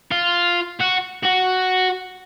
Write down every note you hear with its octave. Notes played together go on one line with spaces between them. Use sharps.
F4
F#4
F#4